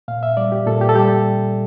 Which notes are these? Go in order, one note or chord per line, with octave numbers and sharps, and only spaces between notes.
A#2 F5
E5
G3 D5
G4
A#2 A4
G4
A4
G3 G4